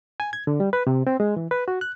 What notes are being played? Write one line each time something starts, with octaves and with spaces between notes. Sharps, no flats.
G#5
G#6
D3
G3
B4
C3
C4
G#3
E3
B4
F#4
F#6